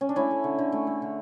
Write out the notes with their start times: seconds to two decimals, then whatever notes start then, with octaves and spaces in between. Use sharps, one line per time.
0.01 C#4
0.09 D4
0.16 A3 C#4 E4
0.31 A3
0.44 D3
0.59 D3
0.72 A3
0.87 A3
1.02 D3